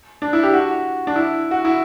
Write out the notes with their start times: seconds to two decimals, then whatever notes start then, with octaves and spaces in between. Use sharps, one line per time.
0.22 D4
0.33 E4
0.43 G4
0.53 F#4
1.07 D4
1.16 E4
1.51 F#4
1.65 E4